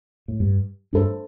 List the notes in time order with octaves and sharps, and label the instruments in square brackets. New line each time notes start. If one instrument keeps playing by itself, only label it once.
[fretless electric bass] A2
G2
[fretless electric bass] G2 [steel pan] D4 A4 C5